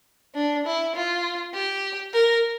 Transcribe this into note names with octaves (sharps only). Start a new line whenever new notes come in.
D4
E4
F4
G4
A#4